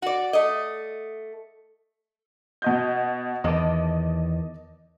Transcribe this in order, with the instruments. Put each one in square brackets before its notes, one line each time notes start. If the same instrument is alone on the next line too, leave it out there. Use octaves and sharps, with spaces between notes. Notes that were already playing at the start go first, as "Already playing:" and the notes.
[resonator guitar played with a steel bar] F#4 D5
A3 D#5
[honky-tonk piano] B2 D#5 G6
[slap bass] E2 D#3 [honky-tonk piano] D#5 A5 D6